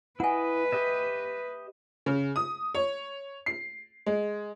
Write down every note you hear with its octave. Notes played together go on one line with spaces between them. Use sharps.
E4 B4 D#5 F#5 G#5
G4 D#5 E5
C#3
D#6
C#5
C7
G#3